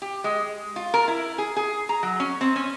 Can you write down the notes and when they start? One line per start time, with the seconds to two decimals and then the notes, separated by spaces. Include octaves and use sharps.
0.02 G4
0.24 G#3
0.76 F4
0.94 A#4
1.08 E4
1.38 G#4
1.56 G#4
1.89 A#5
2.03 F#3
2.20 C#4
2.41 C4
2.56 C#4